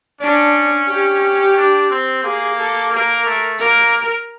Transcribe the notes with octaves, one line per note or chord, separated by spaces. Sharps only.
C#4 D4
G4
D4
C4
A#3 G#4
A4
A#3 A#4
A3
A#3 A#4